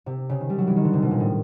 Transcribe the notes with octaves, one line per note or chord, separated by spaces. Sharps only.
C3
C#3
D#3
G3
F#3
E3
D#3
D3
C3
B2
A#2
A2